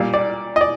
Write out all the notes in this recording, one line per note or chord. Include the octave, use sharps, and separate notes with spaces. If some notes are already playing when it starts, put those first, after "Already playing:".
Already playing: A#2 G3 F5
D5
D#5
D5